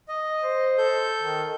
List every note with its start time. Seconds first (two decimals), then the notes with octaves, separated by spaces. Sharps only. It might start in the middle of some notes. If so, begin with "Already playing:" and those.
0.08 D#5
0.43 C5
0.78 A4 G6
1.22 D#3